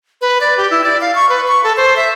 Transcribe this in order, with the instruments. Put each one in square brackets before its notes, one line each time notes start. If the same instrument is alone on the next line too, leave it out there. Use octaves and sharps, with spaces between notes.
[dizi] B4
D5
G4
E4
D5
F5
C#6
B4
C#6
A4
C5
E5